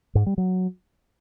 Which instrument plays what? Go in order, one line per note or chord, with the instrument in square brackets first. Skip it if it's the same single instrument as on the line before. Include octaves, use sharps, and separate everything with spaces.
[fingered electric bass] G#2
G3
F#3